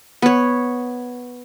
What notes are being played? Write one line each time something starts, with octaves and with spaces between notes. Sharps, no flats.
B3 C#5